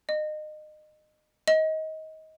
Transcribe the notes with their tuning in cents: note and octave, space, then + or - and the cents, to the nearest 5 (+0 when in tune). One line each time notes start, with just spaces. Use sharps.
D#5 -30
D#5 +20